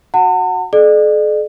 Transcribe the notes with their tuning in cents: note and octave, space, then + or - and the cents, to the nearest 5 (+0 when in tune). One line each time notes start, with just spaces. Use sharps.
F#4 -10 F#5 +0 A5 +45
A4 -45 D5 +45